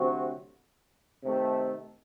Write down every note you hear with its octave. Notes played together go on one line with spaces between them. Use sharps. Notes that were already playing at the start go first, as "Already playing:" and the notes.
Already playing: D2 C3 F#3 C4 F#4
C3 D#3 A3